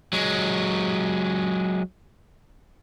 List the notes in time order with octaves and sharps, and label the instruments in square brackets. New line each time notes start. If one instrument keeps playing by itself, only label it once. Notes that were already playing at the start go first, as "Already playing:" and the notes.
[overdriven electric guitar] F#3 G#3